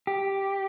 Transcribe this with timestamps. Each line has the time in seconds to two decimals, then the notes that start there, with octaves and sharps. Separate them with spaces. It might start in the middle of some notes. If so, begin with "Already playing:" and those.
0.07 G4